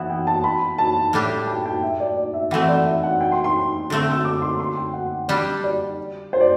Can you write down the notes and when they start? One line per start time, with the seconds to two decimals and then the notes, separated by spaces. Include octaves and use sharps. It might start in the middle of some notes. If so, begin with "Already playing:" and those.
Already playing: E3 B3 E4 F#5
0.10 G5
0.27 A5
0.44 B5
0.78 A5
1.13 A2 G3 D4 G4
1.47 G5
1.66 G5
1.83 E5
2.00 D5
2.17 D5
2.34 E5
2.51 E3 A3 C4 F#5
2.68 D5
2.86 E5
3.03 F#5
3.21 G5
3.32 C6
3.44 C6
3.90 D3 A3 C4
4.12 E6
4.25 D6
4.42 C6
4.60 C6
4.77 G5
4.93 F#5
5.28 G3 D4 G4 D5
5.64 D5
6.33 C5
6.41 D5